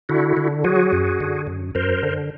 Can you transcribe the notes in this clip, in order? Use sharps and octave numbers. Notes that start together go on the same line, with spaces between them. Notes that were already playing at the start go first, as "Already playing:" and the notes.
D3 E4 F#4
D3
F#3 F#4 G#4
F#2
D3
F#2
F#2 A#4 C5
D3